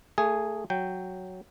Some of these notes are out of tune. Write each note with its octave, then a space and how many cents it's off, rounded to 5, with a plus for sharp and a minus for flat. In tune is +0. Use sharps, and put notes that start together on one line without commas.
A3 +25 G#4 +0 G#5 +0
F#3 +0 G5 +0